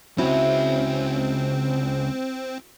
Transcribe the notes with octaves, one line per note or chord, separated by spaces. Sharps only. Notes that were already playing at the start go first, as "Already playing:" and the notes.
C#2 C4 C#4 E4 F#4